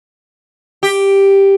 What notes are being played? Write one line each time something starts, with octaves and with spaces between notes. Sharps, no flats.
G4